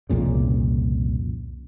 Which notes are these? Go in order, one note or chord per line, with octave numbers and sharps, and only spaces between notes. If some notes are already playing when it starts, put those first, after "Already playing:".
C2 F2 A#2 C#3